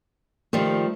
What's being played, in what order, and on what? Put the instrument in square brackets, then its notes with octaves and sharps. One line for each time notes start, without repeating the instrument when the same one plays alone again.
[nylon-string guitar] D#3 F3 G3 [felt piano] A3